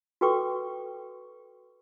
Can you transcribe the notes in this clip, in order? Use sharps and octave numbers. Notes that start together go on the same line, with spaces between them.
F#4 A4 B4 G5 C#6 D6